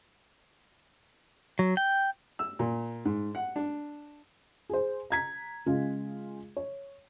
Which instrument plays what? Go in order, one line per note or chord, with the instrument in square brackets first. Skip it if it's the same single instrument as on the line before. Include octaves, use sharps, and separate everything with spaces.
[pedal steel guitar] F#3
G5
[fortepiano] E6
A#2
G#2
F#5
D4
[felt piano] G#4 C5
A#5 G#6 B6
C#3 G#3 F4 G#4
C#5